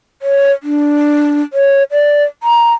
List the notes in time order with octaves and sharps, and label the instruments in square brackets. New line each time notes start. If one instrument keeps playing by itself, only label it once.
[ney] C#5
D4
C#5
D5
A#5